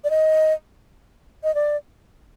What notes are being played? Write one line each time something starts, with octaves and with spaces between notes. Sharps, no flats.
D5
D#5
D#5
D5